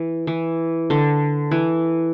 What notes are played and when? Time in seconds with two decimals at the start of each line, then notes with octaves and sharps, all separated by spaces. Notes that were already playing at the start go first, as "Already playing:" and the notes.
Already playing: E3
0.27 E3
0.90 D3
1.51 E3